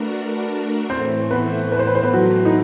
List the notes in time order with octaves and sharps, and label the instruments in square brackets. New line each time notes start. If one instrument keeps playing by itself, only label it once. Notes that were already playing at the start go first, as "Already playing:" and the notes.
Already playing: [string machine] A3 D4 F#4 A#4 [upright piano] B4
[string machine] A2 E3 A3 [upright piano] C4 C5
[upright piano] B3 B4
B4
C5
B4
C5
B3 B4
F#3 F#4
D#4